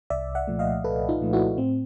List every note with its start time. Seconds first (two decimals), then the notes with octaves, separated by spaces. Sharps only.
0.10 C2 D5 E5
0.35 E5 F#5
0.47 A#2 F3 A3
0.59 D#5 F5
0.84 C2 A4 B4
1.09 D#4 F4
1.21 A#2 F3 A3
1.33 E4 F#4
1.58 A2 C4